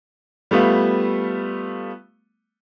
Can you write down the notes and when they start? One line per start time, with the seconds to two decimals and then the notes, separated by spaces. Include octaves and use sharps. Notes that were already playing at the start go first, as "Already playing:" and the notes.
0.51 G3 A3 B3 F4